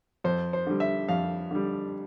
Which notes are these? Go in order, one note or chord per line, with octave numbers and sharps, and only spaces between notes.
F2 C5
C5
D3 G3
E5
F2 F5
D3 G3